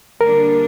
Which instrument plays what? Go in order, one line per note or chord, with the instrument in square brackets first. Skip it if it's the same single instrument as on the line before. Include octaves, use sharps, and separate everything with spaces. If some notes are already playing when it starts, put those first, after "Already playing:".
[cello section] D3 G3 A#3 D4 [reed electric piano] A#4